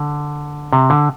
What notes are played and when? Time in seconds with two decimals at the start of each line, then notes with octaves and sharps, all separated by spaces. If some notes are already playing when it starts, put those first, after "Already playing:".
Already playing: D3
0.73 C3
0.90 D3